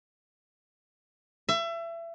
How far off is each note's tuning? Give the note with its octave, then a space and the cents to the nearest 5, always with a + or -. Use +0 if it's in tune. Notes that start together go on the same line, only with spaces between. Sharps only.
E5 +30